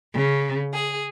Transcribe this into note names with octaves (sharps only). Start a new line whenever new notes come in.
C#3
G#4